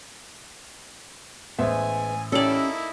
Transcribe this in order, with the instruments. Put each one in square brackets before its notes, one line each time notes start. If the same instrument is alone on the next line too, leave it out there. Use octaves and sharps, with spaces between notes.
[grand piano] A1 C5 E5 [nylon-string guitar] G#3 B3 [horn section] G#5
[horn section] A#3 D#4 E4 [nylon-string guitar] C#4 G4 [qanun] A4 D5